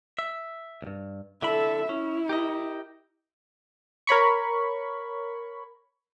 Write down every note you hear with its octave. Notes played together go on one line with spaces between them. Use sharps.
E5
C2 G2
D3 E4 A4 E5 B5
C#4 E4
G4 A#4 D#5
A#4 C#5 B5 C#6